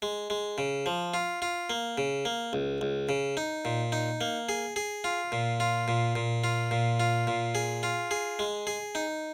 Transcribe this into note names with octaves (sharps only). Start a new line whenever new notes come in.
G#3
G#3
C#3
F3
F4
F4
A#3
C#3
A#3
C#2
C#2
C#3
D#4
A#2
D#4
A#3
G#4
G#4
F4
A#2
F4
A#2
A#2
F4
A#2
F4
A#2
G#4
F4
G#4
G#3
G#4
D#4